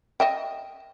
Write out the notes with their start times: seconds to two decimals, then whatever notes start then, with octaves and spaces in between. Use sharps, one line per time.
0.20 D#5 E5 G5